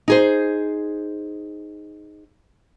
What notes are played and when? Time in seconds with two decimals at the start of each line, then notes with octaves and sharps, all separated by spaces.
0.08 D#4 G#4 C5